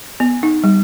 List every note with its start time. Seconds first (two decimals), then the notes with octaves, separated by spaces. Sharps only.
0.20 B3
0.43 D#4
0.64 G3